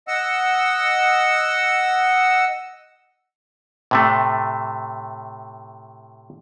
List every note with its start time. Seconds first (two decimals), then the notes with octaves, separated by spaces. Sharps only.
0.08 D#5 F#5 E6
3.91 A2 C3 A3